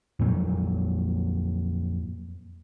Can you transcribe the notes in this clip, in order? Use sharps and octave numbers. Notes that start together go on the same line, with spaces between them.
F2 A#2 F#3